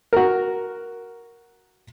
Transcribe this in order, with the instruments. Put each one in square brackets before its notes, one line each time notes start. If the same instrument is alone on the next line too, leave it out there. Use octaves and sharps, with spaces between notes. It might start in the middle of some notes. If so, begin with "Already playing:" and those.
[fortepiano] F#4 A#4